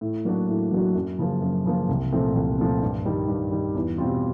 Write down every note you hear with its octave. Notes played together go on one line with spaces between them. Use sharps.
A2
F#3 A#3 D4 F#4
A2
F#3 A#3 D4 F#4
F#2
C#3 F3 A#3
F#2
C#3 F3 A#3
C2
A#2 F3 A3 C4
C2
A#2 F3 A3 C4
G2
D#3 G3
G2
D#3 G3
E2
B2 G3 C4 F4